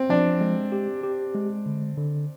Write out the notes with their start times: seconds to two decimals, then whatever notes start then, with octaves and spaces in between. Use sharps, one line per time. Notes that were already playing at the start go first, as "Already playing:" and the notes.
Already playing: C4
0.09 F3 D4
0.41 G#3
0.72 G4
1.03 G4
1.35 G#3
1.66 D3
1.97 D3